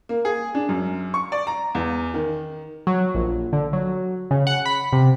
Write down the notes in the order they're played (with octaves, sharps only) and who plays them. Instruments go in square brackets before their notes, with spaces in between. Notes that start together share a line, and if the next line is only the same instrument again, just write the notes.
[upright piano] A#3
G#4
D4
F#2
C#6
D5
A#5
E2
D#3
[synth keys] F#3
A#1
D3
F#3
C#3
F#5
B5
C3